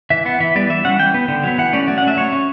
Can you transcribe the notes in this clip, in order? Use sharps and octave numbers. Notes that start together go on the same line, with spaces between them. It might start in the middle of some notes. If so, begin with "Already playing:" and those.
E3 E5
B3 F#5
E3 E5
G3 B3 D5
E3 E5
G3 C#4 F#5
E3 G5
B3
D3
F#3 B3
E3 F#5
A3 C#4 D5
F#3 D5
F#5
A3 C#4 E5
F#3 C#5
C#4